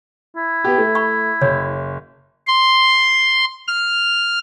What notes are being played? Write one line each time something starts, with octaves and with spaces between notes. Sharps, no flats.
E4
B3 G4
A3
B5 C#6
F#1 C#5
C6
F6